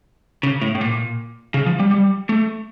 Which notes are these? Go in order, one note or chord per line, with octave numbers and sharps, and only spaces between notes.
C#3
A2
A2
A#2
C#3
F3
G3
G3
A3